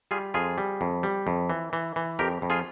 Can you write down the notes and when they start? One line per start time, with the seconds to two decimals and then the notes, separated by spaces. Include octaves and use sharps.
0.11 G3 F4 G#4
0.34 F2 F4 G#4
0.58 G3
0.81 F2
1.03 G3
1.27 F2
1.50 E3
1.73 E3
1.96 E3
2.19 F2 G4 A#4
2.42 F2
2.50 F4 G#4